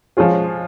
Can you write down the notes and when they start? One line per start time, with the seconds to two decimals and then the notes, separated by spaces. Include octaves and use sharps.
0.17 F3 G#3 C#4 F4 G#4